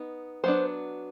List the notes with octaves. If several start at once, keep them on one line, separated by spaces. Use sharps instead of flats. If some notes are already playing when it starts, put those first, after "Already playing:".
Already playing: B3 D#4
F#3 B3 D4 C5